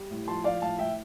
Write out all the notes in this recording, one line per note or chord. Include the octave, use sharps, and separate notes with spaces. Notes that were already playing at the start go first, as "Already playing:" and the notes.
Already playing: G3
A2
F3 A5 C6
F3 D5 F5
A2 F5 A5
A2 E5 G5